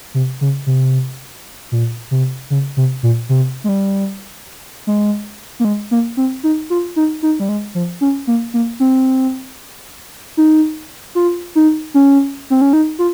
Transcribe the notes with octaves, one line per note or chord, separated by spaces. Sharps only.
C3
C#3
C3
A#2
C3
C#3
C3
A#2
C3
G#3
G3
G#3
A#3
G#3
A#3
C4
D#4
F4
D#4
D#4
G3
G#3
F3
C#4
A#3
A#3
C4
D#4
F4
D#4
C#4
C4
C#4
D#4
F4